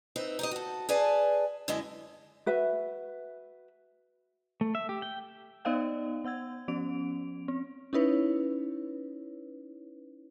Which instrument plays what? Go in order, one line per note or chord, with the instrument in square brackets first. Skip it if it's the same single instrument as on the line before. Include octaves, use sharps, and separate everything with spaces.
[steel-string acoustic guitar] C4 D#4 B4 E5
D#4 G4 D#5
F#4 A4
G#4 B4 D5 F5 G#5 A5
F#2 D3 G#3 E4 D#5 E5
[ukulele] F#4 B4 E5
[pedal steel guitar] A3
E5
G4
G5
[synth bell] B3 D#4 D5 D#5 F5 G5
B3 F#5 E6 G#6
F3 B3 C#4 D7 F7
C4
C#4 D#4 E4 B4 C#5